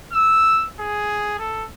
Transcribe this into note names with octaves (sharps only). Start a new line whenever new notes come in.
E6
G#4
A4